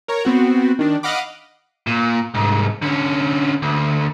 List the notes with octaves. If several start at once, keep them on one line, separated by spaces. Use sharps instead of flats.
A#4 C#5 A#5
B3 C4 F#4
D#3 D4
D#5 F5 F#5 B5 D6
A#2
C2 G#2
D3 C#4
D2